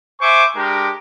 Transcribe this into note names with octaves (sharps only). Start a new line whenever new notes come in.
C5 E5 G#5 C#6 D6
G#3 D4 G4 A#4